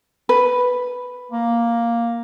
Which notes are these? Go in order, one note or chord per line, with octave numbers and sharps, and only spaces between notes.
B4
A#3